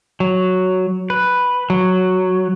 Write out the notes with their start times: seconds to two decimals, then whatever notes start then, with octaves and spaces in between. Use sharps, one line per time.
0.20 F#3
1.10 B4
1.70 F#3